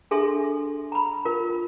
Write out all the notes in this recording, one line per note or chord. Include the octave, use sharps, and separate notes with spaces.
D4 G#4 A4 E5 C6
A#5 B5
F4 A#4